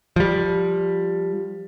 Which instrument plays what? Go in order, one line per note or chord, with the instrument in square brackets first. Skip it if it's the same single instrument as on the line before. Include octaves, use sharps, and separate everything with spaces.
[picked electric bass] F3 G3